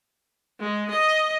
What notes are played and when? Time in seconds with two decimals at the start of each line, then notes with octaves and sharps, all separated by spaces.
0.60 G#3
0.91 D#5